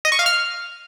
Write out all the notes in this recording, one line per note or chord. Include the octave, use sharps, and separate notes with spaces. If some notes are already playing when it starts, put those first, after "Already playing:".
D#5
C#6
F5
F6